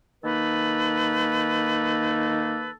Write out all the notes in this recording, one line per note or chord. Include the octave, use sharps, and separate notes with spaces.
D#3 A#3 D#4 A4 B4